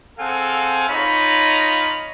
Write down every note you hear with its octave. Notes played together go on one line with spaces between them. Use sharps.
C4 G#4 A4 F5 F#5 G#5
D#4 F4 C#5 D#5 A#5 B5